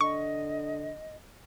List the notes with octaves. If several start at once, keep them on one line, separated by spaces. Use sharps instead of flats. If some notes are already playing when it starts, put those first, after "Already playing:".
D3 D#5 C#6